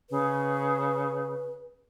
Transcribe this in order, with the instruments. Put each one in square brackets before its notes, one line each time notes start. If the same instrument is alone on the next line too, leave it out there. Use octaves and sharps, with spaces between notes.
[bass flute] C#3 [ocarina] B4